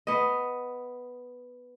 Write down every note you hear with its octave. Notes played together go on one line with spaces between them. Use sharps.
B3 D#5